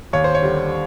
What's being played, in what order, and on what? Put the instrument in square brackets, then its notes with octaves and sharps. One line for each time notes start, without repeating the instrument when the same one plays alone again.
[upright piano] D#2 C#5
C5
C#5
D3 G3